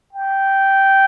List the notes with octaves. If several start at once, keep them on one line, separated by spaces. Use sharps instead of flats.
G5